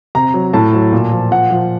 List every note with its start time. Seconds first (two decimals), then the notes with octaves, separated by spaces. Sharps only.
0.15 C3 A#5
0.34 F#3
0.53 A2 A5
0.73 F#3
0.92 A#2
1.12 F3
1.31 A#2 F#5
1.51 F3